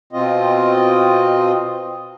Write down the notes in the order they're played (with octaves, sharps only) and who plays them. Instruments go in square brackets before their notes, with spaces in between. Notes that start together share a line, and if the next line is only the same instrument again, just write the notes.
[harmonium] B2 C4 F4 D#5